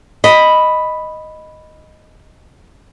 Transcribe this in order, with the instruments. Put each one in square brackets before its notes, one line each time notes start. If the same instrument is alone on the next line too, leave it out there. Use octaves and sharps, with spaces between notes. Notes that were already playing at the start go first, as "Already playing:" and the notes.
[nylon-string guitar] D#5 [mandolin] B5